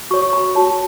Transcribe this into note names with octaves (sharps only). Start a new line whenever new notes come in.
F#4 C#5 C#6
B5
F#4 C#5 A5